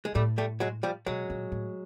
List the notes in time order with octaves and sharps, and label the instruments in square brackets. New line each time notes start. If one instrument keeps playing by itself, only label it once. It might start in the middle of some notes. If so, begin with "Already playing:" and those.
[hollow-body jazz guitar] G#3
[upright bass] A2 [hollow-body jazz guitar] G3 A3
[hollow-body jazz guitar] G3 A3
F#3 G#3
F3 G3
[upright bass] B2 [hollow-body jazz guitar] F#3 G#3
[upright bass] A#2
A2